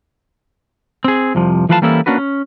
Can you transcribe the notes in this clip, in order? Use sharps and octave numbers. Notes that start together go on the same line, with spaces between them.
C4 G#4
C2 F2 C3 F3
E3 F3 A3 B4 F5 A5
E3 G3 A#3 C#4 E4 A4
A#3 C#4 D4 F#4 B4
C#4